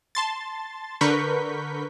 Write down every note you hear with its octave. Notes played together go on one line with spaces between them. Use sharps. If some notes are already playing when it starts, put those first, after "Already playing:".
A5 C6 A6
D3 A#4 B4 C#6 G6 B6